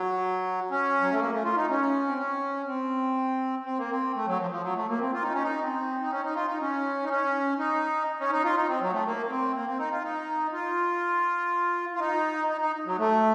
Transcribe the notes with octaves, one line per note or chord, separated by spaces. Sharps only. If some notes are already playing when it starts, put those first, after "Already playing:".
Already playing: F#3
C#4
F#3
A3
A#3
A3
F4
D#4
C#4
C4
C#4
C4
C4
A#3
C4
A3
F#3
F3
F3
F#3
A3
A#3
C4
F4
D#4
C#4
D#4
C4
D#4
C#4
D#4
F4
D#4
C#4
D#4
C#4
D#4
C#4
D#4
F4
D#4
C4
F#3
A3
A#3
A#3
C4
A#3
C4
D#4
F4
D#4
F4
F4
D#4
D#4
D#4
F#3
A3